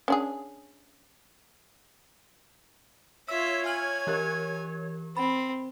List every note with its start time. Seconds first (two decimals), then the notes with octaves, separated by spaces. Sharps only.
0.08 C#4 D4 G#4
3.28 F4 C#5 E5 E6
3.66 G#5 F6 F#7
4.07 E3 G4 A#4
5.17 C4 B5